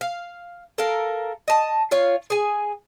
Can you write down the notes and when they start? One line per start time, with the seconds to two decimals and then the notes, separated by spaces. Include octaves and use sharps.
0.01 F5
0.78 A4 A#4 F5
1.48 D#5 A5
1.91 F4 C#5 F5
2.30 G#4 G#5